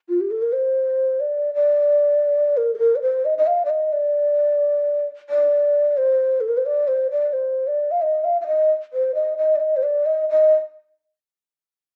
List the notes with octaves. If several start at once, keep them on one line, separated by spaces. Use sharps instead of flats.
F4
G4
A4
A#4
C5
D5
D5
A#4
A4
A#4
D5
C5
D#5
D#5
F5
D5
D#5
D5
D5
C5
A4
A#4
C5
D5
C5
D5
C5
D5
F5
D#5
F5
F5
D#5
C5
D#5
D#5
D5
D#5
C5
D5
D#5
D#5